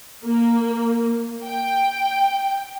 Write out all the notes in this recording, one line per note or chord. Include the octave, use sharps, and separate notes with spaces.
A#3
G5